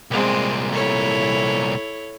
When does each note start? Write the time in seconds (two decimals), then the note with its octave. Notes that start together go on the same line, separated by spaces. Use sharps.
0.11 C2 A#2 G#3 C4
0.73 E4 A4 C#5